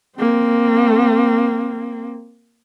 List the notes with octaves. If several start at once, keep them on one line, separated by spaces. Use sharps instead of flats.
A#3 C4